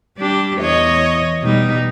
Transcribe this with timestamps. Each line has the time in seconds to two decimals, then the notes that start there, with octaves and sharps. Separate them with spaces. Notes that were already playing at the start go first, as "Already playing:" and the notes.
0.17 G3 D4 G4
0.58 E2 C#5 D#5
1.41 B2 G3 D#4